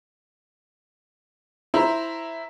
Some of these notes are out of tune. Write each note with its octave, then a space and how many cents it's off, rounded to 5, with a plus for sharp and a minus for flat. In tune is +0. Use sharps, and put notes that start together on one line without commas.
E4 +0 C5 +0 A#5 +0